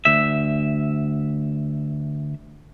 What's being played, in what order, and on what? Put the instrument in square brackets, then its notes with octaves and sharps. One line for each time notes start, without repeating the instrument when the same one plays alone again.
[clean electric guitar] D2 E5